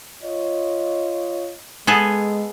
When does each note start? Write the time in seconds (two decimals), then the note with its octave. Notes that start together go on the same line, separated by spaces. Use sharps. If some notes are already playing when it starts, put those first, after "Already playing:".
0.23 F4 C#5 D#5
1.87 G#3 B3 G#4 A4